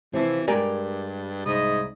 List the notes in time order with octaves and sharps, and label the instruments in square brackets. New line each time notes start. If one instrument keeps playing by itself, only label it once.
[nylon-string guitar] C3 F3 E4 [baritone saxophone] E3
[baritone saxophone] G2 [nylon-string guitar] G#3 G4 [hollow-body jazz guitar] A#4 D5 G#5
[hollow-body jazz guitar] C2 [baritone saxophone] G#2 [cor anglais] D#5